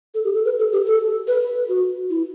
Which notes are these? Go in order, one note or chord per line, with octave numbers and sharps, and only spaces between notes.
A4
G4
A4
B4
A4
G4
A4
B4
F#4
E4